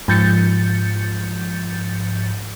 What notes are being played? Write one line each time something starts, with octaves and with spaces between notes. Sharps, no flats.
G#2 F3 G6 A6 C#7